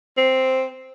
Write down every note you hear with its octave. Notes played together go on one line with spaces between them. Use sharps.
C4